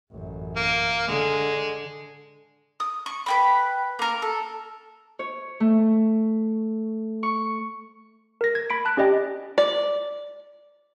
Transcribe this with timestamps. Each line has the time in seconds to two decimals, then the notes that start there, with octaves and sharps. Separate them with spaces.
0.12 A1 F#2
0.56 A#3
1.08 D3 G#3
2.80 D#6
3.06 C#6
3.26 B4 G5 B5
3.99 A#3 A#4
4.22 A4
5.19 C#5
5.60 A3
7.23 C#6
8.41 A#4 A#6
8.55 G#6
8.70 B5 B6 D7
8.85 A5 F#6
8.97 C#4 G4 D5 D#5 G5
9.58 D5